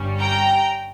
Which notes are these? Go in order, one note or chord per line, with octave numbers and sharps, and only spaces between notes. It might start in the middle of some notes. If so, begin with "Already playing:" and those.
Already playing: G1 G2 G3 C#4
G5 A#5